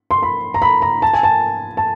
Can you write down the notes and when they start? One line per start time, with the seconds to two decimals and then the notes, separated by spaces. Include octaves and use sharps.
0.11 C6
0.22 B5
0.54 A#5
0.62 B5
0.82 A#5
1.02 A5
1.13 G#5
1.23 A5
1.77 A5